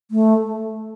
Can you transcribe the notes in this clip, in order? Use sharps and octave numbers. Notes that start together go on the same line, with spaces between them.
A3